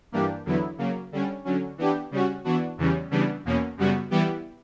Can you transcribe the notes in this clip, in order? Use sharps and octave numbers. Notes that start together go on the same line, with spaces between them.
G2 E3 A#3 D4 G4
E2 D3 F#3 B3 E4
C#3 F#3 A#3
D3 G3 C#4
D3 F#3 C#4
E3 B3 D4 G4
C#3 G3 C#4 F#4
E3 B3 D4 F#4
E2 C#3 E3 G3 C#4
C#3 E3 G3 B3 D4
E2 B2 A#3 C#4
F#2 C#3 G3 B3 F#4
E3 G3 B3 E4 G4